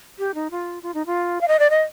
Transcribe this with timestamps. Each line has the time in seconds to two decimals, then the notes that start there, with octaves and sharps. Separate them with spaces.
0.19 G4
0.34 D#4
0.51 F4
0.83 F4
0.94 D#4
1.06 F4
1.41 F5
1.48 D#5
1.59 D5
1.70 D#5